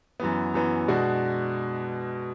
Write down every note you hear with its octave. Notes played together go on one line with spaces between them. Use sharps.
F#2 E3 B3
F#2 E3 B3
B2 G#3 D4 F#4